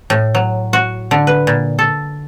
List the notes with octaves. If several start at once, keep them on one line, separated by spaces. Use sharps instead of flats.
A2
F#3
F#4
D3
B4
A#2
A4